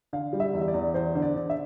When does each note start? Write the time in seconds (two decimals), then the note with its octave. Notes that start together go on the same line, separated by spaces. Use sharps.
0.13 D3 F5
0.33 G3
0.40 E5
0.53 E2
0.61 E5
0.68 D5
0.74 E2
0.94 E2 C5
1.15 D3
1.22 D5
1.36 D3
1.50 E5